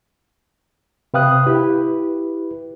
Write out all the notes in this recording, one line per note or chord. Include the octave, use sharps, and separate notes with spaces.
C3 B4 F5 G5 D#6 F#6
E4 G4 B4